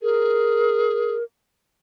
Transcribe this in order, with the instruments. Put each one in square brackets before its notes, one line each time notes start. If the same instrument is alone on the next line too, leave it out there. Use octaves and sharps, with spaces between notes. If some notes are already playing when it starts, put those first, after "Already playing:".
[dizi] G#4 [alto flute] A#4